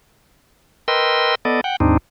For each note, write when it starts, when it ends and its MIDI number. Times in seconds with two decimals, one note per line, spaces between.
0.88 1.35 70
0.88 1.35 71
0.88 1.35 75
0.88 1.35 79
0.88 1.35 84
0.88 1.35 88
1.45 1.61 59
1.45 1.61 69
1.45 1.61 74
1.45 1.61 75
1.64 1.76 78
1.64 1.76 79
1.80 1.97 39
1.80 1.97 44
1.80 1.97 60
1.80 1.97 62
1.80 1.97 63